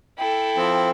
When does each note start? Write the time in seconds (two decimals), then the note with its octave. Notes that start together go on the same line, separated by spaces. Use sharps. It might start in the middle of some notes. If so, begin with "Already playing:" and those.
0.18 E4 A4 G5
0.57 F3 C4